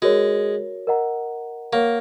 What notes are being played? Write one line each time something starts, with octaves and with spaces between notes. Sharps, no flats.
G#3 F#4 A#4 C#5
A#4 D#5 F#5 A#5
A#3 A#4 C#5 F#5 C#6